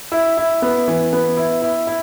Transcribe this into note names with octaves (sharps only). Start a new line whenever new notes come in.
E4
E4
B3
E3
B3
E4
E4
E4